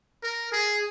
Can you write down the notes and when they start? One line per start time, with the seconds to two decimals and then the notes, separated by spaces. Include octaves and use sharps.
0.23 A#4
0.52 G#4